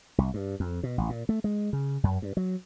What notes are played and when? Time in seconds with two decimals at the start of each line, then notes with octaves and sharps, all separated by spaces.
0.18 C2
0.34 G2
0.60 F2
0.83 B2
0.98 A1
1.10 A#2
1.29 A3
1.44 G#3
1.73 C#3
2.03 F#2
2.22 G2
2.37 F#3